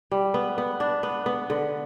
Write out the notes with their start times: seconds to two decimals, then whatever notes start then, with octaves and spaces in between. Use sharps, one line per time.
0.11 G3
0.34 B3
0.58 B3
0.80 D4
1.03 B3
1.26 B3
1.50 D3